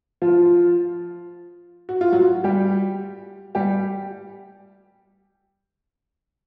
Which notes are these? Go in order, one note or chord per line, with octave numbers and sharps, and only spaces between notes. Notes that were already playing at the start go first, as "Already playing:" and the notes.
F3 F4
F#4
F4
F#3 F#4
G3 G4
G3 G4